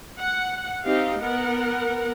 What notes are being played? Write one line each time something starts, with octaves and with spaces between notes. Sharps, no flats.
F#5
C4 D#4 G4 F5
B3 A#4 F#5